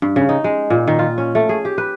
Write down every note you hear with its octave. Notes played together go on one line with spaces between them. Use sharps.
G2
C#3
D#4
G#3
A#2
D#3
F4
C#4
A3
G#4
G4
B4